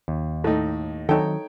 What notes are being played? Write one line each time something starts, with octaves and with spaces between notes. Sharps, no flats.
D#2
A2 D#4 A4
D#3 F#3 C4 D#4 A4 C#5 G5